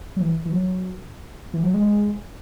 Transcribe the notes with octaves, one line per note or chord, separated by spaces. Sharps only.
F#3
E3
E3
F#3
E3
F#3
G#3